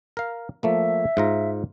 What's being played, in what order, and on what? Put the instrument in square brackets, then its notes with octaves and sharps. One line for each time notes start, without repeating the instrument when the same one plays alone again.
[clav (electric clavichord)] A#4 F5
[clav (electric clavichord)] F3 A3 A#3 [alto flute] E5
[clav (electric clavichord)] G#2 F4 A#5